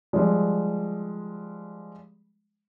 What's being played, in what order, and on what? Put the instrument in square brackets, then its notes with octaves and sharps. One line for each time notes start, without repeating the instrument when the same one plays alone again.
[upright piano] F3 G3 G#3